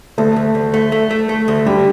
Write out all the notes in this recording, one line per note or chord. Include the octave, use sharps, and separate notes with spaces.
D2 A3
D2
D2
A3
A3
A3
A3
D2
D3 G3